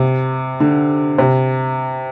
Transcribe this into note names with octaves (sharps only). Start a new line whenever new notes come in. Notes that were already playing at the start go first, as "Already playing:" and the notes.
Already playing: C3
D3
C3